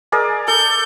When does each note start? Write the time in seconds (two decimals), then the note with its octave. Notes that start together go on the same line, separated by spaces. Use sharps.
0.12 G#4 A#4 D5
0.48 A4 G6